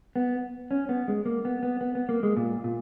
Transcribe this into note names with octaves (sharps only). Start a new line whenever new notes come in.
B3
C#4
B3
G#3
A#3
B3
B3
B3
B3
A#3
G#3
A#2
A#2